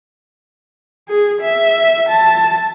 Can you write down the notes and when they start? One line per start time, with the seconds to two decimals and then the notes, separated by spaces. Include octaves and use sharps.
1.09 G#4
1.41 E5
2.09 A5